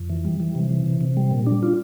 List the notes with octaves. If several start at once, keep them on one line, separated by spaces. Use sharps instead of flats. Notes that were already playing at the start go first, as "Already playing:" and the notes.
Already playing: F2
E3
G3
E3
C3
E3
C3
C3
G3
A#2
D4
F4